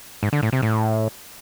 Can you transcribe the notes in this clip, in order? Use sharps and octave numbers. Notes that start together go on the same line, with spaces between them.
G#2
D3
A2
C3
A2